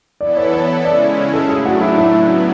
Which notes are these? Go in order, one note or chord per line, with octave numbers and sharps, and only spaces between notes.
E3 B3 E4 A4 D5
C#5
C#5
C#3 G#3 C#4 E4 D5
A4
A2 F#3 A3 D4 G#4
F#4
E4
E4
C#3 F#3 B3